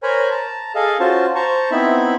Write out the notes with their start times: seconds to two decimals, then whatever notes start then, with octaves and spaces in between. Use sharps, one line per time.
0.03 A#4 C5 C#5 G#5 A#5 B5
0.31 A5 A#5
0.75 G#4 A4 D#5 F5
1.00 C#4 F4 F#4 C5 A5
1.35 C5 A5 A#5 C#6
1.71 B3 C4 D#4 E4 E5 B5